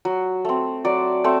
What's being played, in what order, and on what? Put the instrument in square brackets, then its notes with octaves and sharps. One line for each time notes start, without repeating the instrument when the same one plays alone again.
[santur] F#3
A3 C4
F#3 D5
A3 C4